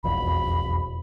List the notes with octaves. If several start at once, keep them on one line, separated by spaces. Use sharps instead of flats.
E1 B1 F2 B5